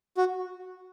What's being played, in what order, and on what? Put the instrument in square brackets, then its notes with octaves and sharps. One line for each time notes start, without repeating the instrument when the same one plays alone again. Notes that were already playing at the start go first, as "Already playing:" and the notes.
[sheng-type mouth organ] F#4